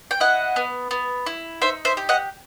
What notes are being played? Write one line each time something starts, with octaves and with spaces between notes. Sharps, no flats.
G5
E4 D#5 F#5
B3
B3
E4
D#4 C5 E5
C5 E5
G4
D#5 F#5